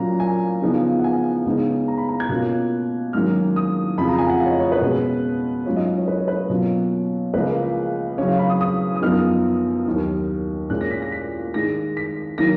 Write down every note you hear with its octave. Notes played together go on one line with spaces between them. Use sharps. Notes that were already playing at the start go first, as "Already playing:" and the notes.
Already playing: A#2 F#3 C#4 F4 A#5
G#5
C#3 F3 B3 D#4
F#5
G#5
C#2 C#3 G#3 B3 D#4
A#5
B5
A#5
G#6
B2 A#3 C#4 F4 F#6
G#2 D#3 F#3 A#3 C#4 F6
D#6
F2 C#3 F3 B5
A#5
G#5
F#5
F5
C#5
D#5
C#5
B4
B2 G#3 C#4
G#2 F#3 C#4 F4 C#5
D#5
D#5
C#5
B4
C#5
B4
B2 F#3 A#3 C#4 F4 C#5
C#2 C#3 F3 A#3 B4
C#3 F#3 C#4 C#5
F5
B5
D#6
D#6
D#6
F#2 F3 B3 D#4 F6
D#2 D#3 F#3
A#2 G#3 C#4 F#6
A#6
B6
A#6
B6
G#2 D#3 G#3 A#6
B6
D#3 F#3 A#3 A#6